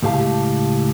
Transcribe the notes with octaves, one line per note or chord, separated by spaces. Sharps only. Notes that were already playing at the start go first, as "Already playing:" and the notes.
C#2 A2 G4 F5 A5